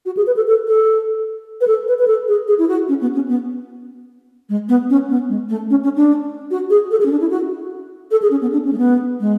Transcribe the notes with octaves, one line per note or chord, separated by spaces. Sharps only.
F#4
G#4
B4
A4
A4
A4
B4
A4
B4
B4
A4
G#4
G#4
E4
F#4
C#4
B3
C#4
B3
G#3
B3
C#4
B3
G#3
A3
C#4
C#4
D4
F#4
G#4
A4
G#4
C#4
D4
E4
F#4
A4
G#4
C#4
B3
D4
C#4
A3
B3
G#3